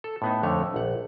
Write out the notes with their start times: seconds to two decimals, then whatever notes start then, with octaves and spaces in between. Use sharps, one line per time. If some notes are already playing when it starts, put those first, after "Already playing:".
0.04 A4
0.22 A2 B3 D#4
0.43 F2 D3 A3 C#5
0.74 A#1 F#5